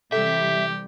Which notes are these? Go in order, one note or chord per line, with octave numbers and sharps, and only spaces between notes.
C3 E3 G3 G4 A4 E5